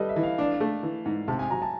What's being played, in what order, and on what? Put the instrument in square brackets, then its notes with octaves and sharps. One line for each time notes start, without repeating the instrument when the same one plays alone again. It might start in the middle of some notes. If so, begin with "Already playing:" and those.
Already playing: [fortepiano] G3 [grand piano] A4 B4 D#5
[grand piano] E5
[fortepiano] E3
[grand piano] F5
[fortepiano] D4
A3
E3
G#2
[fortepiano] C3 [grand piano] A5
[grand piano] G#5
[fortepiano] F#3 [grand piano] A#5
[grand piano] A5